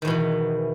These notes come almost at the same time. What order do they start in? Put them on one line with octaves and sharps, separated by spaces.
D#3 E2 B2 E3